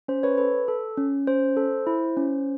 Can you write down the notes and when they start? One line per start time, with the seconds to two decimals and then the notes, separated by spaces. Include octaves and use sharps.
0.08 C#4 C5
0.23 B4 C#5
0.38 A4 B4
0.68 A4
0.97 C#4
1.27 C#4 C5
1.57 A4
1.87 E4
2.17 C#4